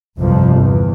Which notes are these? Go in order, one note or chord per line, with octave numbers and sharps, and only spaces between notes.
G1 C2 F2 C3 F3
E2